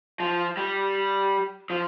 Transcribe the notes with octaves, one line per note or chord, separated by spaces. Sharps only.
F3
G3
F3